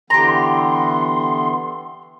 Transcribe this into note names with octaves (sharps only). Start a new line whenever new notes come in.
D3 E3 B3 G4 A#5 C6